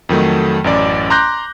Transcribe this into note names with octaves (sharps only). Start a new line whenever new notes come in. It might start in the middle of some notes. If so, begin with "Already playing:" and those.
F2 D#3 F#3 A3
A1 F#2 D5 D6
A#5 C6 D6 F#6 G6 A#6